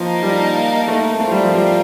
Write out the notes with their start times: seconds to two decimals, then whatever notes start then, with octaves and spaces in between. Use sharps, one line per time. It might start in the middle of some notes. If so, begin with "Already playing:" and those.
Already playing: F3 A#3 D#4 A#4 F5 A5
0.23 G3
0.88 A3
1.20 A3 C4 F4 A#4
1.32 G3
1.43 F3
1.55 G3